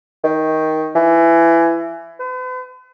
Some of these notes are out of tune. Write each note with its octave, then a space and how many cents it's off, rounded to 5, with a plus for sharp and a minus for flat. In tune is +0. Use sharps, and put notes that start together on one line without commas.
D#3 +15
E3 +20
B4 +45